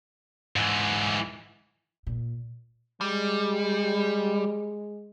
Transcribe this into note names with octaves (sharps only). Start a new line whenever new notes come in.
G#2 E3
A#2
G3 G#3